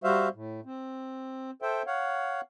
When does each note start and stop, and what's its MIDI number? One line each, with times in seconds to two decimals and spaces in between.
0.04 0.29 55
0.04 0.29 66
0.04 0.29 72
0.04 0.29 76
0.04 0.29 77
0.35 0.61 45
0.65 1.51 60
1.62 1.82 69
1.62 1.82 72
1.62 1.82 76
1.62 1.82 79
1.87 2.41 73
1.87 2.41 77
1.87 2.41 78